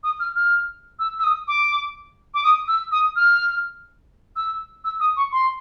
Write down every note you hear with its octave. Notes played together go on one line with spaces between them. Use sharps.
D#6
F6
F6
E6
E6
D#6
D6
D6
D#6
E6
D#6
F6
E6
E6
D#6
C#6
C6